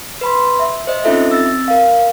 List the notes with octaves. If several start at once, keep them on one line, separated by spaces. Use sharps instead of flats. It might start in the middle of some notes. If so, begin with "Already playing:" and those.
B4 B5 C6
E5
C5 D#5
C4 C#4 D#4 F4 A4 E5
C4 E6 A6
A#4 F5